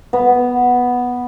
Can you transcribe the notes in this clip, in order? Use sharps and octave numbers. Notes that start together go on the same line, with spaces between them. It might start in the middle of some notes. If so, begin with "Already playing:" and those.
B3